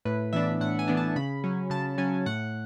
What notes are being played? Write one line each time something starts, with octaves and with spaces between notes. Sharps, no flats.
A2 B4
E3 B3 D4 E5
A2 F#5
G#5
E3 B3 D4
A5
C#3 B5
F#3 C#4
C#3 A5
F#3 C#4 G#5
A2 F#5